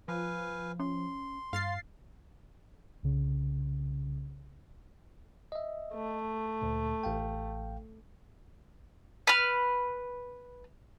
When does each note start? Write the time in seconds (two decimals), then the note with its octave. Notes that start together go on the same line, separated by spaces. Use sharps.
0.08 F3 B4 F5 G#5
0.80 C#4 C6
1.53 G2 F5 A6 C7
3.03 C2 C#3
5.52 D#5 E5
5.93 A3
6.62 D2 A#2
7.03 A1 F5 G5
9.27 B4 F6